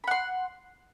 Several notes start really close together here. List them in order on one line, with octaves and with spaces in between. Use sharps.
B5 F#5 C6